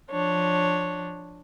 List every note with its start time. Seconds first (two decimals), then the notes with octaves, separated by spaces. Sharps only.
0.11 F3 D4 C#5